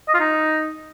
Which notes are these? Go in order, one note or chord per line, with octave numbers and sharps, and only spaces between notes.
D#5
F4
D#4